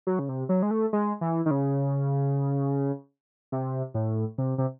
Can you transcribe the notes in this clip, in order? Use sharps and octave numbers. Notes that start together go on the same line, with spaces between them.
F#3
C#3
C3
F#3
G#3
A3
G#3
E3
D#3
C#3
C3
A2
C3
C3